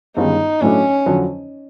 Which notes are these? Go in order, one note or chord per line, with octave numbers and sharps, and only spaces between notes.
G1 G2 D#3 G#3 C#4 D#4
A2 F#3 A3 C#4 D4
F2 D3 F#3